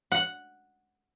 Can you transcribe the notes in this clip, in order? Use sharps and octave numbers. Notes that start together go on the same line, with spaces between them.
F#5